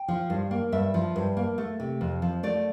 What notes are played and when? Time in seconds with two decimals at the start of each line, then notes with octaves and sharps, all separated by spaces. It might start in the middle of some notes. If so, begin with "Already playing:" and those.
Already playing: G5
0.08 F3
0.30 G2
0.51 A#3
0.72 G2 E5
0.94 F3
1.16 G2
1.37 A#3
1.58 A3
1.80 C3
2.01 F2
2.22 F3
2.43 A3 D5